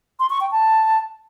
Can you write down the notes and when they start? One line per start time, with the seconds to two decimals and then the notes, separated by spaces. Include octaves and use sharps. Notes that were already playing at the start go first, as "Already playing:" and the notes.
0.19 C6
0.30 C#6
0.41 G5
0.51 A5